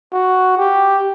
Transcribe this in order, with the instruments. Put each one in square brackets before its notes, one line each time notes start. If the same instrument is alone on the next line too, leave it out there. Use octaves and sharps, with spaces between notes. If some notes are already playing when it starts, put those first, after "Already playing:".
[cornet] F#4
G4